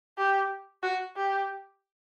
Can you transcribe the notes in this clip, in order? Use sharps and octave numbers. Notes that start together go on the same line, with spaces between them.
G4
F#4
G4